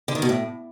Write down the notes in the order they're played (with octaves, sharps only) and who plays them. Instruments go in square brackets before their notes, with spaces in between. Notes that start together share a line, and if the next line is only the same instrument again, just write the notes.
[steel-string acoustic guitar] D3
D#3
B2
A2